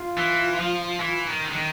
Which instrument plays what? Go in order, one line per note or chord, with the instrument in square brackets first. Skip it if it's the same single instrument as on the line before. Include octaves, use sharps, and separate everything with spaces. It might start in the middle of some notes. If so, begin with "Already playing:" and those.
Already playing: [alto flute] F4
[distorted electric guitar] E3
F3
E3
D#3
D3
D#3